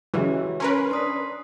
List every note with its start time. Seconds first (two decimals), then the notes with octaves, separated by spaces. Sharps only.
0.14 C#3 E3 F#3 G#3 F#4 G4 E5
0.60 C#4 A#4 B4 C6
0.91 D4 C6 D#6 B6